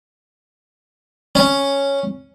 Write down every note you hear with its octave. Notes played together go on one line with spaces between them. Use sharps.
C#4